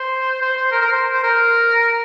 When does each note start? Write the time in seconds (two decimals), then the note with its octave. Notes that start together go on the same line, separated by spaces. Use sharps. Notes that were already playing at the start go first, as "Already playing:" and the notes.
Already playing: C5
0.42 C5
0.57 C5
0.72 A#4
0.82 A#4
0.92 C5
1.13 C5
1.23 A#4